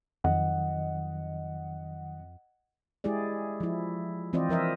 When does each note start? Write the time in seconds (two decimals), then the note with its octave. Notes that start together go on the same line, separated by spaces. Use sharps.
0.24 F2 D#3 F#3 D#5 F#5
3.04 G#3 E4 G4 G#4 D5
3.60 F3 E4
4.33 E3 C4 F4 C5 D5 D#5
4.49 F3 A#4 D#5 E5